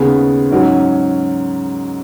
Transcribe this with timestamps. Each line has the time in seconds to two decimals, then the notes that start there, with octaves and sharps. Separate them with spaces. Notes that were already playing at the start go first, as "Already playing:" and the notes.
Already playing: D#2 C#3 B3 G#4
0.51 G#2 F#3 C#4